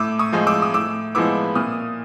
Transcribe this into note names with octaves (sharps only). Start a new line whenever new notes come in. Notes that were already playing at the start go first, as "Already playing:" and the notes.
Already playing: A2 D6 E6
C#6 D#6
F3 G#3
D6 E6
D#6
A2 D6 E6
F3 G#3 B3 E4 D6 E6
A#2 D#6 F6